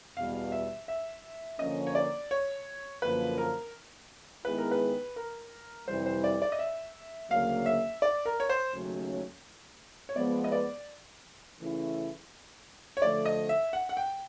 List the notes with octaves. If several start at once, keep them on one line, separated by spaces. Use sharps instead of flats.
E2 B2 G3 F5
E5
E5
D3 F3 A#3 C#4 D#5
C#5
D5
C#5
F#2 D3 F3 A#3 B4
A#4
D#3 G#3 B3 E4 G#4 B4
A#4
B4
A#4
F2 C3 E3 G3 C5
C5
D5
D5
D#5
E5
D2 C#3 F#3 A#3 F5
E5
D5
A#4
C#5
C5
D#2 C#3 F#3 A3 C#4
C#5
F3 G#3 B3 D5
D#5
D5
C#3 E3 A3 C#4 E4
C#5
D3 F3 A3 D5
D#5
E5
F#5
F#5
G5